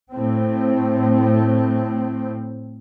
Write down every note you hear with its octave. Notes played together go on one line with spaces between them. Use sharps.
A2 C4